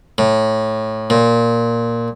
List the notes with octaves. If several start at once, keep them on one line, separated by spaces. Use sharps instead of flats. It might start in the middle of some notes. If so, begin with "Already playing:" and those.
A2
A#2